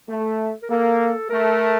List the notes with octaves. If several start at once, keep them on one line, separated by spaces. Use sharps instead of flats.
A3
A#4
A#3 A4
A3 A#4